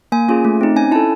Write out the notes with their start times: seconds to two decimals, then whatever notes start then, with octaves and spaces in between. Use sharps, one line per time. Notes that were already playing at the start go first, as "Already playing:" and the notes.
0.12 A#3 G#5
0.28 C#4 F4 G#4
0.45 A3
0.61 C4 D#4
0.76 C#4 G#5
0.91 E4 A4 A5